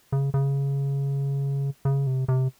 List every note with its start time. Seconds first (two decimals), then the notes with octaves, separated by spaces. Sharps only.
0.12 C#3
0.34 C#3
1.85 C#3
2.07 C3
2.28 C3